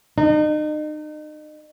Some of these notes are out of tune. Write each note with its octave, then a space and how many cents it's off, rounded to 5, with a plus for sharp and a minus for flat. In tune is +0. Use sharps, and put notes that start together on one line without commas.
D#4 -35